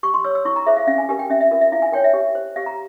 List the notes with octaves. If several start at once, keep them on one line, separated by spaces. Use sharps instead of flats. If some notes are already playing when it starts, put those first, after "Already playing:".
G4 C#6
C6
C#5 E6
E6
E4 C#6
A#5
G#4 C5 E5
F5
C#4 F5
G#5
G4 A#4 G#5
G5
C#4 E5
E5
F4 A#4
E5
E4 F5
G#5
A#4 C#5 G5
E5
G4
C5
G4 F5
A#5